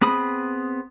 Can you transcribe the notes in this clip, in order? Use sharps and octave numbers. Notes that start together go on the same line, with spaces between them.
B3 C4 G#4 B5 D#6